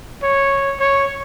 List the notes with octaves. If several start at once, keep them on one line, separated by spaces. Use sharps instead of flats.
C#5
C#5